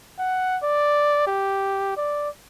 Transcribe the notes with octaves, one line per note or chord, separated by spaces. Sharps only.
F#5
D5
G4
D5